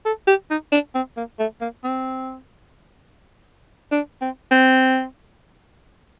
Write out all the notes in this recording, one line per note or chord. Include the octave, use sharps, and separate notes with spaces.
A4
G4
D#4
D4
C4
A#3
A3
A#3
C4
D4
C4
C4